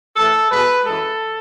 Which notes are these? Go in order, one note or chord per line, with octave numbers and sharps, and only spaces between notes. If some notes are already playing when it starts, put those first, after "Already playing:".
A2 E3 A3 A4
B2 G#3 B4
F#2 E3 G#3 A4